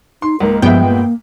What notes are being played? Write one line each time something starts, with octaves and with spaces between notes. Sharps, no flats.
D#4 C6
C#2 G#2 A#3 A#4
G2 A#2 F3 G#3 B3 E5 G5
A#3